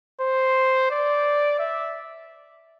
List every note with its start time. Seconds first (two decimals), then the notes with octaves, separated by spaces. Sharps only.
0.21 C5
0.90 D5
1.59 E5